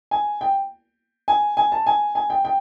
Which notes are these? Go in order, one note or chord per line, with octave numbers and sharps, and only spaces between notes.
G#5
G5
G#5
G#5
A5
G#5
G#5
G5
G5